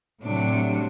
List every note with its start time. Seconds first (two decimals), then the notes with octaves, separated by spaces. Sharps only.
0.23 A2 C3 F#3 D4